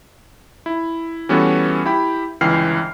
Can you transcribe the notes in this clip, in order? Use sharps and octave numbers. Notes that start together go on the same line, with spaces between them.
E4
E3 G3 B3 C#4 F#4 A4
E4 G4 G5 B5
G1 C#2 E3 G5 F6 C7